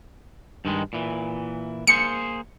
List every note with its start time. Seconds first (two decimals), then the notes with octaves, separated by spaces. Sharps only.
0.65 G2 D#3 G#3
0.93 A#2 E3
1.87 A#3 G#4 C5 C#7